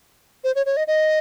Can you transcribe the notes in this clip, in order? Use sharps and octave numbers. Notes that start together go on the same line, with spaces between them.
C5
C#5
C#5
D#5
D#5